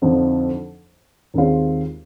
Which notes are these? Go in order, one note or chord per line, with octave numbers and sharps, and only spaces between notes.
F2 D3 F3 C4 D#4
D#2 D#3 G#3 C4 F4